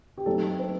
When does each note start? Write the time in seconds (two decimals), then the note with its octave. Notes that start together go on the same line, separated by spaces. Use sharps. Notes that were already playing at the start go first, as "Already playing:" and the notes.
0.18 G4
0.26 F#3 A3 C4 D#4 A4
0.59 C5